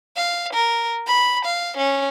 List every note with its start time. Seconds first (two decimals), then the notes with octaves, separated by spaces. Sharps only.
0.16 F5
0.53 A#4
1.07 B5
1.45 F5
1.78 C#4